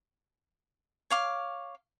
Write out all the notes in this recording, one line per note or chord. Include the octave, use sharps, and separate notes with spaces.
C#5 F5 D6